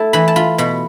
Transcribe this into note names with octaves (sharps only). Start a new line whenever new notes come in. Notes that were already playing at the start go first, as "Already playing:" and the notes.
Already playing: A3 E4 A5
E3 B5
A5
F4 B5
B2 B5